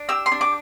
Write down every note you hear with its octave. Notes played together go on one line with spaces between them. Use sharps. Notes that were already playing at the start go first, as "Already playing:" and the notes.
Already playing: D4
G4 E6
C6
D4
D6